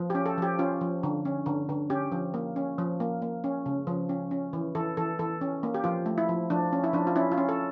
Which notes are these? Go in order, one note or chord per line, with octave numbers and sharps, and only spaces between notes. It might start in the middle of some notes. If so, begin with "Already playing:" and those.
Already playing: F3
C#4 G4
A4
F3 G4
C#4 F4
F3
D3
C#4
D3
D3
C#4 G4
F3
A#3
C#4
F3
A#3
A#3
C#4
C#3
F3
C#4
C#4
E3
E3 A4
E3 A4
E3 A4
C#4
A#3
G4
F3 F4
A3
E4
F3
F3 D4
C#4
E4
F3 D4
F4
C#4 E4
F4
C#4
A4